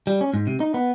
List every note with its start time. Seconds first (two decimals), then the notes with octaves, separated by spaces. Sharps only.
0.07 G3
0.21 C#4
0.34 G#2
0.47 C3
0.60 D#4
0.74 B3